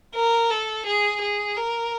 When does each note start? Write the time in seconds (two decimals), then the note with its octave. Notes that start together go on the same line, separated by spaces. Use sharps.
0.15 A#4
0.50 A4
0.86 G#4
1.21 G#4
1.57 A#4